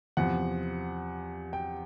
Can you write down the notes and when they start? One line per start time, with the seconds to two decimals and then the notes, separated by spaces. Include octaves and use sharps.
0.17 E2 C3 F3 F#5
1.53 G5